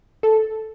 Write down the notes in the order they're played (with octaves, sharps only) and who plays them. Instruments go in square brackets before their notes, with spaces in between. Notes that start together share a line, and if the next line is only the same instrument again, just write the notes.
[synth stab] A4